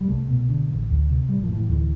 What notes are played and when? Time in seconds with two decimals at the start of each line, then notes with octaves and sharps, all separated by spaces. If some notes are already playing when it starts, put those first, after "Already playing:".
0.01 G3
0.08 C2 A3
0.28 B2
0.49 D3
0.69 A1
0.89 D2
1.09 C3
1.29 A1 G3
1.43 F3
1.49 A2
1.56 E3
1.69 D2 E3